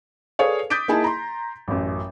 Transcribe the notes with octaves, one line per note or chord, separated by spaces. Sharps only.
G#4 A4 B4 C#5 D5 F5
D6 D#6 G6 A6 B6 D7
A#3 D#4 E4 G#4 G#5 A5
A#5 C6
A1 F#2